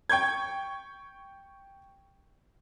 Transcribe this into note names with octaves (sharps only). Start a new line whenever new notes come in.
G5 C#6 G6 G#6